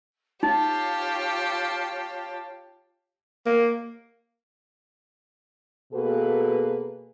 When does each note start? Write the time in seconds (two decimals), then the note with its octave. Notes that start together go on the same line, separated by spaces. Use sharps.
0.43 D#4 F4 G4 C#5 A5
3.46 A#3
5.92 B2 A#3 F#4 G#4 A4 B4